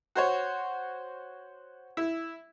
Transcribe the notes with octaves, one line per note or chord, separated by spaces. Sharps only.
F#4 C5 C#5
E4